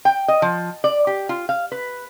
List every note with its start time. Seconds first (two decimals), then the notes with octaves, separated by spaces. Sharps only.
0.05 G5
0.28 D#5
0.42 F3
0.84 D5
1.07 G4
1.29 F4
1.49 F5
1.72 B4